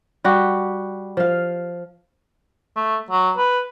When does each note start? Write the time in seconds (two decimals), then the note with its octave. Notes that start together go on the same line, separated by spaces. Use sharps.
0.24 G3 F#4 G4
1.17 F3 F5
2.76 A3
3.10 F#3
3.37 B4